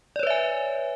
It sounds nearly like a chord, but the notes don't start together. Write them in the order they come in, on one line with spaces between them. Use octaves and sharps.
D5 C#5 B4 E5 G#5